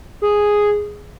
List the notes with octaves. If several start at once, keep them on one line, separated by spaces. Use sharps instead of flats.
G#4